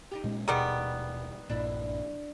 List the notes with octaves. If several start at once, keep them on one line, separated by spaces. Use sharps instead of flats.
D#4 F4 G4
A#2 G#3 C#4
D#1 B2 D#3 G3 B3 G#4
A#1 G2 A#2 D4 E4